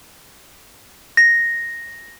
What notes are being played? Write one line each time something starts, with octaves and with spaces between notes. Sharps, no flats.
A#6